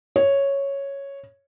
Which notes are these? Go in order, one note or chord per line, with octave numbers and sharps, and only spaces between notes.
C#5